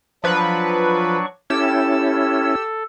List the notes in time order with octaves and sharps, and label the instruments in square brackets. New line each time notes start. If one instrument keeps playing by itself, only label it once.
[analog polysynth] F3 B4 [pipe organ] F#3 D4 C#6
[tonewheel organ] C#4 E4 [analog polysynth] G4 E6 [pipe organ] A4